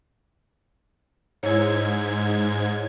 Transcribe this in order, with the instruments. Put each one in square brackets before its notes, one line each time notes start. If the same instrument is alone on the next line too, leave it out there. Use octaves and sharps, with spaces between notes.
[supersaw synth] G#2 G#6 [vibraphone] E4 C#5